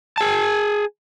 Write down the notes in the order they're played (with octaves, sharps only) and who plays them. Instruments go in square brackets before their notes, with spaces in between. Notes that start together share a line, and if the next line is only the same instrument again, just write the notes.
[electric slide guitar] G#4 A5